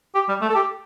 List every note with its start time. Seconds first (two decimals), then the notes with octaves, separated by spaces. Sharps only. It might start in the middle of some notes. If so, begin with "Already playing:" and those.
0.15 G4
0.29 G3
0.41 A3
0.50 A4
0.55 G4